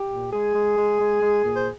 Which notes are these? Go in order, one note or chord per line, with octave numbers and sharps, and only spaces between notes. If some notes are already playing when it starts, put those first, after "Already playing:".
Already playing: G4
A#2
G#3 G#4
G#3
G#3
G#3
G#3
A#2
C5